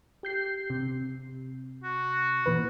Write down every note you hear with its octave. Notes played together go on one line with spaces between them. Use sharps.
G4 G6 C7
C3
F#4
A#2 E3 B4